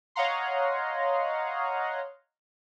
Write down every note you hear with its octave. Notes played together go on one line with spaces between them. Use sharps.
C#5 D#5 F5 F#5 A#5 C6